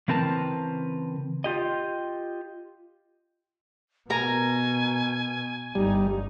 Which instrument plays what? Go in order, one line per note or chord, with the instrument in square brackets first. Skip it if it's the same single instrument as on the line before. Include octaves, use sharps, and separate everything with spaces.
[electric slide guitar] C#3 E3 C4 A#4 B4 A5
F4 G4 D#5
[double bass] B2 [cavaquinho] A#4 A#5 [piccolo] G#5
[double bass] G1 D#4 [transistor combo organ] G3